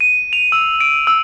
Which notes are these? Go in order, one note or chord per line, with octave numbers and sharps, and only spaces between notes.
D#7
F7
E6
D7
E6